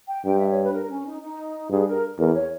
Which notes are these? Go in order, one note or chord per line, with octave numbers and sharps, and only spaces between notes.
G5
G2 G5
E5
C#5
B4
A#4
C#4
D#4
D#4
G2 G#4
A#4
E2 A#4
C#5